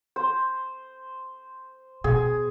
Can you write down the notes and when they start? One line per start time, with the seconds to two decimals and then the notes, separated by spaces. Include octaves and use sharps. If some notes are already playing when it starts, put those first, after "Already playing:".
0.16 C5
2.04 B2 G#4